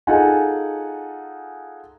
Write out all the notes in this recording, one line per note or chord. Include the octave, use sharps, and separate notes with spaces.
D#4 F4 G#4 A4 F#5 G#5